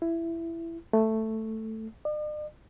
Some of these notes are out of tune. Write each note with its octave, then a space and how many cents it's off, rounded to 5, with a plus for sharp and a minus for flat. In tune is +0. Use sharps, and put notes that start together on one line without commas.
E4 +15
A3 +5
D5 +45